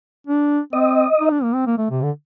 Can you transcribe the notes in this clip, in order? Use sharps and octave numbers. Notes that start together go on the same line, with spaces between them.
D4
C4 D#5
D#4
D4
A#3
C4
A#3
A3
C3
D3